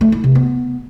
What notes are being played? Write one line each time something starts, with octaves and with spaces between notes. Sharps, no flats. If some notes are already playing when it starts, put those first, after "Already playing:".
A3
E4
C3
B3